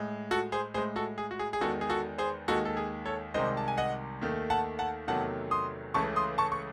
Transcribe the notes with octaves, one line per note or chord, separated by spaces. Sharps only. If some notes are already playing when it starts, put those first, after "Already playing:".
Already playing: A2 G#3
F#4 A4
G#4 C5
A2 G#3 G#4 C5
F#4 A4
G#4
F#4
G#4
G#4
E2 D#3 G#3 F#4 A4
G#4
F#4 A4
G#4 C5
D#2 D#3 G#3 F#4 A4
A4
G#4
A4 C#5
C2 C3 D#3 G#3 C5 D#5
A5
G#5
D#5 F#5
D#2 D#3 A3
F#5 A5
F#5 A5
E2 C3 D#3 F#3 A3 F#5 A5
C6 D#6
C#2 C#3 E3 A3 A5 C#6
C6 D#6
A5 C#6
C#6